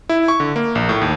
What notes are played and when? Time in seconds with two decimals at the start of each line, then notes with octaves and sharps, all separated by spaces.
0.09 E4
0.28 C#6
0.40 D3
0.56 A#3
0.75 A#1
0.89 A2
1.01 D#2